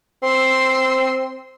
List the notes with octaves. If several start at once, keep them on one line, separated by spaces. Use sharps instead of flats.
C4 C6 E6